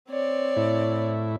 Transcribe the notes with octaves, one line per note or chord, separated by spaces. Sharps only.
C4 C#5 D5
A2 E4